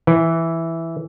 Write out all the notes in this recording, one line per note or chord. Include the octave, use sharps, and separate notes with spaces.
E3